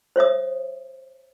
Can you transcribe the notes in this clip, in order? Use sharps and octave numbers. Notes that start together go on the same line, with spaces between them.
C5 C#5 E5 D#6